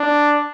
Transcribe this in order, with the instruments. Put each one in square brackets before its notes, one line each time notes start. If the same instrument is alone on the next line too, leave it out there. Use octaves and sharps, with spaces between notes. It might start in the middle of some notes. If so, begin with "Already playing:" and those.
Already playing: [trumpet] D4